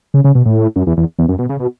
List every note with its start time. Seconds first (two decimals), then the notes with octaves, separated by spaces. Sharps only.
0.14 C#3
0.24 C#3
0.35 B2
0.45 A2
0.76 F#2
0.87 E2
0.97 E2
1.19 E2
1.28 F#2
1.39 B2
1.49 C#3
1.60 B2